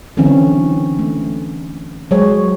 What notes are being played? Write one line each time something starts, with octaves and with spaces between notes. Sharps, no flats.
D3 E3 F#3 C4 C#4
A3
F#3 G#3 G#4 C5 C#5